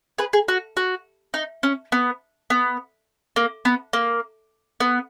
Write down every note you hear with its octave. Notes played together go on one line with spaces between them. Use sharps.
G#4 B4
G#4
F#4
F#4
D#4
C#4
B3
B3
A#3
B3
A#3
B3